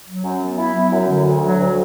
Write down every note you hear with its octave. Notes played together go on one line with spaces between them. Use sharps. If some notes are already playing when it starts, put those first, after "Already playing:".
F#3
F#2
B3
E4
F#3
F#2
D3
D2
F#3
D2